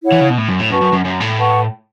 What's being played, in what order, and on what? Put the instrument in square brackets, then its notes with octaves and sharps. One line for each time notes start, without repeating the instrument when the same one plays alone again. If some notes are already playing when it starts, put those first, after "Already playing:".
[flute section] E4 C#5 F#5
[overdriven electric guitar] E3
C#3
B2
A2
F#2
A2
[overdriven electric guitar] F#2 [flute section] F#4 B4 A5 C#6
[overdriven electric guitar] F#2
F#2
F#2
A2
[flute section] B4 F#5 A5 C#6